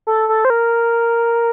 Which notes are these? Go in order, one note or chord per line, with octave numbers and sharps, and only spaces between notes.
A4
A4
C5
A#4